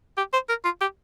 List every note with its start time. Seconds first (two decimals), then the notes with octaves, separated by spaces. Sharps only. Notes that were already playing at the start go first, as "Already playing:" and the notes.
0.17 G4
0.33 C5
0.49 A#4
0.65 F4
0.81 G4